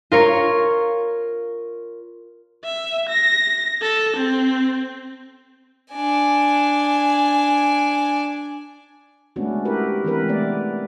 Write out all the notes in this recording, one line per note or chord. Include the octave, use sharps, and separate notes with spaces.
F4 A#4 C#5
E5
A#6
A4
C4
D4 G#5
G#3 A3 B3 C#4 D4 F#4
E4 F#4 G4 A#4 B4
E3 G#3 C4 A#4 B4
A3 B3 D5